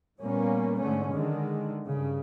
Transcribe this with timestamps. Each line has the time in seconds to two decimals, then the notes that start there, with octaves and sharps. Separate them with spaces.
0.22 A#2 G3 A#3 B3 C#4
0.79 G#2 D3 A3 C#4
1.14 D3 D#3 G#3
1.88 G2 C#3